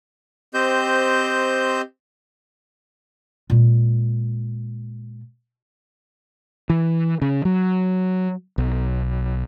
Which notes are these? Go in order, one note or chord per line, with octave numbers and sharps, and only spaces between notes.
C4 G4 C5 D#5 G6
A#2 G#3
E3
C#3
F#3
B1